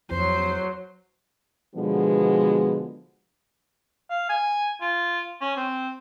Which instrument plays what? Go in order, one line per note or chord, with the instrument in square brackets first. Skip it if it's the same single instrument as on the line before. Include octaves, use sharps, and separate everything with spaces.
[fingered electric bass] F2 [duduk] F#3 [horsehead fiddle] C5
[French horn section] B2 D3 F3 G#3 B3
[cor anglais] F5
G#5
F4
C#4
C4